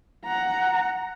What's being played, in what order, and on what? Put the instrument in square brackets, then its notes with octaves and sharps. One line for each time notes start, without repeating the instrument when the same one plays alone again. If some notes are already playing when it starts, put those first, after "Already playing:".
[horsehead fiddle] F#5 A#5